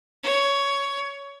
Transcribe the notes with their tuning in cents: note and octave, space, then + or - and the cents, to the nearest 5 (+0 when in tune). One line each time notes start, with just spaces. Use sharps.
C#5 +10